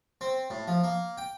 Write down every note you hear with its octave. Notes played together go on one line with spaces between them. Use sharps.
C4
A2
F3
A#3
G5